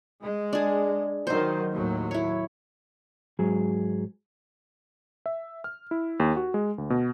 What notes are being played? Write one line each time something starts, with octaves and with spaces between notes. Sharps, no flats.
G#3
D4 G#4
D#3 F#3 D#4 C5
D#2 A2 F#3
E4 C#5
G#2 F#3 G#4
E5
F6
E4
D#2
F#4
G#3
D2
B2